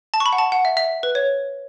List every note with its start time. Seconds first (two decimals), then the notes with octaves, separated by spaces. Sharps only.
0.14 A5
0.20 C#6
0.26 B5
0.33 F#5
0.38 A5
0.52 F#5
0.65 E5
0.77 E5
1.03 B4
1.15 C#5